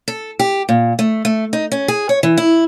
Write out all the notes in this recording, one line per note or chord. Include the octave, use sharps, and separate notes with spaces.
A4
G4
A#2
A3
A3
D#4
C#4
G#4
C#5
E3
E4